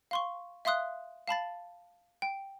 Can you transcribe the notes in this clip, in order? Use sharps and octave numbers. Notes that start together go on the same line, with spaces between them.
F5 C6 C#6
E5 F5 C6 D#6 F#6
F5 A5 B5 A6
G5